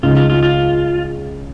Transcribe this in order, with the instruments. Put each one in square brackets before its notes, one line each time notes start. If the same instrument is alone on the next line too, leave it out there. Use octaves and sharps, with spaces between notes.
[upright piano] C#2 C#3 G#3 D#4 [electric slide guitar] F4
[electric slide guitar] F4
F4
F4